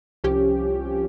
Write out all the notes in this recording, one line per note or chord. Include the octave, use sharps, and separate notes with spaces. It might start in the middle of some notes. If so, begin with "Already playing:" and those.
C2 F3 C#4 G4